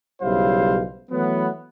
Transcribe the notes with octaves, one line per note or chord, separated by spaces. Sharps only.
B1 C#3 G3 E4 C5 F5
E3 F#3 A3 B3